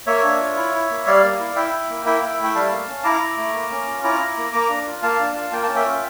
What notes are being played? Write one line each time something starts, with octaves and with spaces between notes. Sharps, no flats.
A#3 C#5 E5
D4
F4
E4
E4
A#3
G3 D5 F5
A#3
E4
E4 E5 G5
E4
A#3
E4 E5 G5
E4
A3
G5
G3 F5 A5
A#3
C#4
E4 A#5 D6
E4
A3
A#3
C#4
F4
E4 A#5 D6
E4
A#3
A#3 A#5 D6
D4
F4
A#3 F5 A5
D4
F4
A#3 G5
A5
C#4
E5 G5
F4